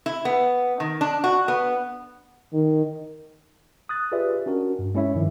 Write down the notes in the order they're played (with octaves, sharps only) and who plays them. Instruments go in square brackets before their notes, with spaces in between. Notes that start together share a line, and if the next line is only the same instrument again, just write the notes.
[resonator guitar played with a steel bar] E4
B3
D#3
D4
F#4
B3
[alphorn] D#3
[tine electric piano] D#6 F#6 A6
F4 G4 G#4 B4 D5 E5
C#4 D4 F#4 A#4
G2
G#3 C#4 E4 C#5 E5
G2 D#3 F3